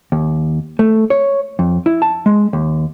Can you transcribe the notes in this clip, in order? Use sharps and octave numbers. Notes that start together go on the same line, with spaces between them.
D#2
A3
C#5
F2
E4
A5
G#3
D#2